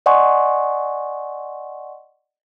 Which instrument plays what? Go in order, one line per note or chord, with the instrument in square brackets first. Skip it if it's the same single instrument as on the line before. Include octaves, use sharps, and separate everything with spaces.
[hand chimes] D5 D#5 F#5 G#5 C6 C#6